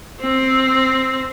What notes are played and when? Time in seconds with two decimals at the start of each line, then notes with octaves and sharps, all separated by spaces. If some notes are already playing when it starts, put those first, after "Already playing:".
0.20 C4